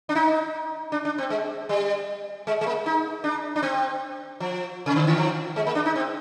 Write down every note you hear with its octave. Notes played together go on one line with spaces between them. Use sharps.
D4
D#4
D4
D4
C4
G#3
G3
G#3
G#3
A#3
D#4
D4
D4
C4
F3
C3
D3
D#3
F3
G#3
A#3
D4
D#4
C4